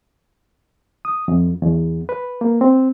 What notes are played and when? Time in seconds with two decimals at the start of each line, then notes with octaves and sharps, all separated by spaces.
1.05 D#6
1.28 F2
1.62 E2
2.09 B4
2.41 A#3
2.61 C4